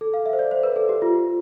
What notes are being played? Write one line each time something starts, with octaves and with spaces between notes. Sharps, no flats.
A4
F5
E5
C5
D5
C5
B4
A4
G4
F4